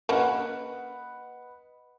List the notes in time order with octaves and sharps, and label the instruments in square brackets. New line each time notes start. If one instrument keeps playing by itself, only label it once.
[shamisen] A#3 C#4 F#4 [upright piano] B4 D#5 F#5